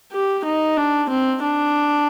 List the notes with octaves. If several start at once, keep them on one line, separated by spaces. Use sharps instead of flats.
G4
D#4
D4
C4
D4